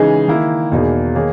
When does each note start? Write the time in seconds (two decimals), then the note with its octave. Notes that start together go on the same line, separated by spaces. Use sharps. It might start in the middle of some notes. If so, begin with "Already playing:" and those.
Already playing: C#3 E3 G#3 D#4 G#4
0.28 D#3 A#3 E4
0.72 E2 B2 A#3 D#4 G#4
1.15 D#3 A#3 D#4 G#4 C#5